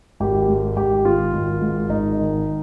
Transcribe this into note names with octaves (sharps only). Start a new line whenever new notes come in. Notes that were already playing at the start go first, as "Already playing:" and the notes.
G#1 G4
G#2
G#1 G4
D#3 F4
G#1
G#2
G#1 D#4
D#3